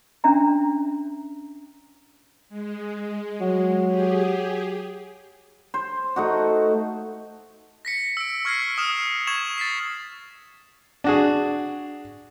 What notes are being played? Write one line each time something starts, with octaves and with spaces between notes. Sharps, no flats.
C#4 D4 E5 A#5
G#3
F#3
G4 G#4
C5
A3 D#4 F#4
A#6 B6 C#7
E6 D7
C#6 F6 G#6 A#6 C7
D#6 F6 E7
C#6 G#6 E7 F#7
A6 B6 C7
D4 F#4 G#4